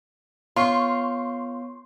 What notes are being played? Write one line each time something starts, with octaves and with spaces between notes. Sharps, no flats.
B3 F4 C#5 C6 C#6 C7